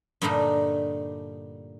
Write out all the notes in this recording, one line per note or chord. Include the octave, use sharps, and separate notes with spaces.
G2 A#2 D3 G3 A3 D#4